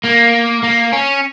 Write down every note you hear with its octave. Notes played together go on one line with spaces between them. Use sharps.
A#3
A#3
C#4